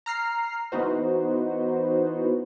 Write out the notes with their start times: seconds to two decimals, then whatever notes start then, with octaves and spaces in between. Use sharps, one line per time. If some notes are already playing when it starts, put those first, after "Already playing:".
0.06 A#5 F6 C7
0.72 E3 B3 D#4 F#4 C5